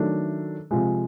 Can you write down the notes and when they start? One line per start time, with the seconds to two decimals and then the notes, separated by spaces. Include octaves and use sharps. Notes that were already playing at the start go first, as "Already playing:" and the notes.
Already playing: D#3 F#3 A3 D4
0.71 C3 F3 G#3